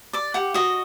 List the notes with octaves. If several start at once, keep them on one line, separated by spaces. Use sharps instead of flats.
D5 D6
G4 F#5
F#4 D#5